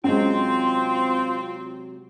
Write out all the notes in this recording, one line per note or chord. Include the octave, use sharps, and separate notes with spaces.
C3 F#3 G#3 C4 C#4 F4